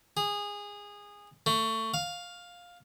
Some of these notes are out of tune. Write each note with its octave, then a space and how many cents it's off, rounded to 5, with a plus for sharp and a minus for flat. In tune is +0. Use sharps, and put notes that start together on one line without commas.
G#4 -20
A3 +20
F5 +10